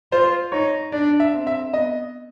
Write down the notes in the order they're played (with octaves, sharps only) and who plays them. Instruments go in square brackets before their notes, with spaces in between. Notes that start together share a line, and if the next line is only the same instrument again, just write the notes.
[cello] F4 [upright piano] C5
[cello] D#4 [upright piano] C#5
[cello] D4 [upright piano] D5
[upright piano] E5
[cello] C4
[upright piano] E5
[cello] B3 [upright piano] D#5